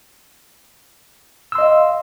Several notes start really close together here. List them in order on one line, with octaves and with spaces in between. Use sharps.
E6 C6 D#5 F5